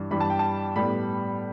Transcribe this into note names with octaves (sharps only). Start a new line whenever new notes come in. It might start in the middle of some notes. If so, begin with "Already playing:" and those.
Already playing: G2 E3 G3
G2 E3 G3 B5
A5
G5
A5
A2 G3 B3 B5